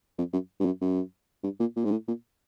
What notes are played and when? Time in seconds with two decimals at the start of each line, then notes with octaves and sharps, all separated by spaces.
0.18 F2
0.33 F#2
0.60 G2
0.65 F#2
0.81 F#2
1.44 G2
1.60 A#2
1.76 A#2
1.85 G#2
1.91 A2
2.08 A#2